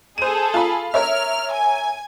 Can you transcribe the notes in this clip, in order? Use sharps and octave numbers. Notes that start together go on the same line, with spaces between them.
G#4 A4 C5 D#7
F4 B5
A#4 C#5 E5 F6
G#5